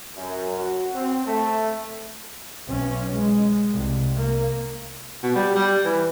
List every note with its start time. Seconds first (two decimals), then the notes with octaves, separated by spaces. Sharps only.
0.16 F#2
0.58 F#4
0.93 C4
1.26 A3
2.66 B1 C#4
3.13 G#3
3.72 C2
4.17 A#3
5.23 B2
5.36 G3
5.55 G3
5.85 E3